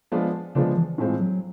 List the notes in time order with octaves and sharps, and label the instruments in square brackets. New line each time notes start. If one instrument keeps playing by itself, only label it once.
[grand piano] F3 G#3 B3 D4 F4
[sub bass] C#3 [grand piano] F3 G#3 B3 D4 F4
[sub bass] E3
[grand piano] A2 E3 G#3 C4 F4
[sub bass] F#3